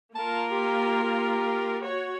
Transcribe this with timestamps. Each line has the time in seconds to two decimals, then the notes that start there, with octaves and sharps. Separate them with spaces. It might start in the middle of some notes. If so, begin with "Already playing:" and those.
0.15 A#3 F4 A#4 A5
0.51 G4
1.04 G4
1.80 F#4 C#5